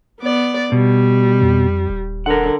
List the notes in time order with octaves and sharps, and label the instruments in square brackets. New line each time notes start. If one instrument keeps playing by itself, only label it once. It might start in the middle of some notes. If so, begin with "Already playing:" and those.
[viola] B3 D5
[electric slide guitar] B2 [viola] G3
[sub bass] F2
D#1
[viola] D3 [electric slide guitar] A#4 F#5